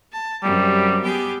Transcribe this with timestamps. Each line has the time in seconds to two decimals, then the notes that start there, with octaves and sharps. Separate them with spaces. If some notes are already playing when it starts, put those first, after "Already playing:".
0.10 A5
0.43 F#2 C3 G3
1.01 B3 G4 G#4